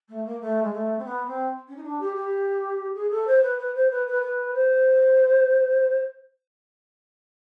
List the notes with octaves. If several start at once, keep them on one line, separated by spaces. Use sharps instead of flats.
A3
A#3
A3
G#3
A3
C4
B3
C4
C#4
D#4
D4
G4
G4
G#4
A4
C5
B4
B4
C5
B4
B4
B4
C5